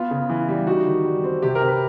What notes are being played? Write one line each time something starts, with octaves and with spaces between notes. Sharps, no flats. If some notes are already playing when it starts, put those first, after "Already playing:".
Already playing: B3 F4
C#3
E3
G3
D#4 F#4
D#3
G3
C4
C3 G4
A#4
C3
B4